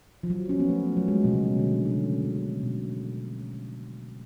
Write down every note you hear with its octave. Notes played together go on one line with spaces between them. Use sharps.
F3
F#3
C#4
B3
A3
F#3
G#3
B2
C#3
D3
C#3
C#3
B2